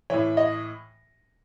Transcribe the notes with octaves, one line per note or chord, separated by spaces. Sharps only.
A2 E3 C#5
D#5